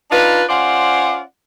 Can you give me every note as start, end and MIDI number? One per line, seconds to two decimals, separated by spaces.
0.11 0.43 62
0.11 0.43 63
0.11 0.43 65
0.11 0.43 71
0.48 1.21 61
0.48 1.21 65
0.48 1.21 72
0.48 1.21 74
0.48 1.21 78